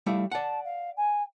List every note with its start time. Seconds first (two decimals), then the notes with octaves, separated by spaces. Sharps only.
0.06 G3 A3 E4 F5
0.32 D5 F#5 A5
0.64 F5
0.96 G#5